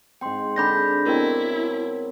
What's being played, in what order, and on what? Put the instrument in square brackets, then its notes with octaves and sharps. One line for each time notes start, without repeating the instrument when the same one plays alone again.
[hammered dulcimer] G#2 C4 [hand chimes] G5 C6
[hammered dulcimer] D3 D4 G#4 [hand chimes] B5 G6 A#6
[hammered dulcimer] B2 C4 C#5 [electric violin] E4 [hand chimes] A#4